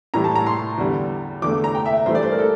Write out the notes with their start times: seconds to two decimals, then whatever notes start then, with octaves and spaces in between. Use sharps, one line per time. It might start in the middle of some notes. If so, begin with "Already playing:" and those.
0.14 A2 E3 G3 A#5
0.24 A5
0.35 A#5
0.46 C6
0.78 E2 D3 G3
1.42 E2 D3 A3 D6
1.64 A#5
1.75 G5
1.86 E5
2.06 G2 E3 A3 C5
2.15 D5
2.23 C5
2.31 A#4
2.39 A4